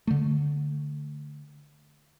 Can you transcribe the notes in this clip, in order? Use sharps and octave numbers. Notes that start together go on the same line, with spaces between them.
D3 A3